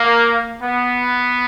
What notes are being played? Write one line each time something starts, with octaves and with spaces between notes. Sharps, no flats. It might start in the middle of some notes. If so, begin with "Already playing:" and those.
Already playing: A#3
B3